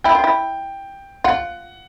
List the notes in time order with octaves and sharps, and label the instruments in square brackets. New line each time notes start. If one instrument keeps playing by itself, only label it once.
[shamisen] E4 [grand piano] G5
[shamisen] F4
E4
[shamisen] F4 [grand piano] F#5